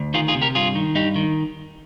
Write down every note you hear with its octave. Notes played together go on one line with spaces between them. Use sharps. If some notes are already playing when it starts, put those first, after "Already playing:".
Already playing: D2
D#3 F4 G#4
F4 G#4
C3
G4 A#4
G2 F4 G#4
D#3
G2 D#4 G4
D#3